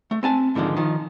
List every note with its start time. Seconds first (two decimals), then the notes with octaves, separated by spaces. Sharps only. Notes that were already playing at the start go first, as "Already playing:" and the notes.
0.11 A3
0.23 C4 G#5 A5
0.55 G#2 D3 D#3 F3 G#3
0.77 D#3 F3